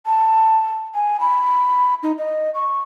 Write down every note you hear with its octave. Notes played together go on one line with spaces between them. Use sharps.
A5
G#5
B5
D#4
D#5
C#6